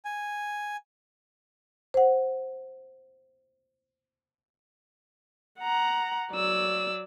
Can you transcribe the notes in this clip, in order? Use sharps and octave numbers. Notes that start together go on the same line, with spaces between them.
G#5
C5 F#5
F#5 A#5
F#3 D5 E6